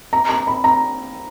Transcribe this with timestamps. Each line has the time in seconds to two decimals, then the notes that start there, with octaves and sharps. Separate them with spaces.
0.13 A#5
0.30 A#5
0.47 B5
0.64 A#5